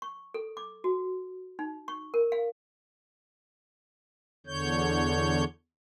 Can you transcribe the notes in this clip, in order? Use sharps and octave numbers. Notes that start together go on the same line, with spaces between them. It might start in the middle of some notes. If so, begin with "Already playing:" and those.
C#6
A4
D6
F#4
D#4
C#6
A#4
F5
E2 D3 C#5 G6